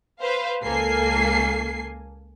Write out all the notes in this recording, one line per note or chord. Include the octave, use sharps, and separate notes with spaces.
B4 C5 F5
C#2 A#3 A4 G#5 C7